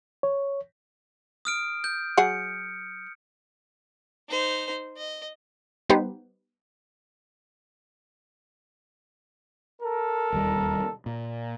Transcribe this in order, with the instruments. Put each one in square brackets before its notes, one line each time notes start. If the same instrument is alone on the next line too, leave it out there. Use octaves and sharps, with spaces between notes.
[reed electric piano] C#5
[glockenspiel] D#6 F6 D7
G6
[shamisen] F#3 G#4 F#5 [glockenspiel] C#7
[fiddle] D#4 C5
D#5
[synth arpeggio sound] G3 B3 D#4 G4 B4 C5
[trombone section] A4 A#4
[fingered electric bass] E1 D#2 G3
A#2